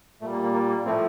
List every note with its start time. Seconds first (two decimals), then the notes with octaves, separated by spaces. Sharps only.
0.21 A#2 G3 A3
0.32 A#3
0.43 A#3
0.54 A#3
0.70 A#3
0.85 A2 F3 A3 C4